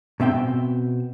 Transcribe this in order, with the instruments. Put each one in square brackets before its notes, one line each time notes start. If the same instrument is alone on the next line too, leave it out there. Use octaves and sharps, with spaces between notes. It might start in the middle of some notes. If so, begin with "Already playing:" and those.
[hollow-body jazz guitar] B2 C4 E5 G5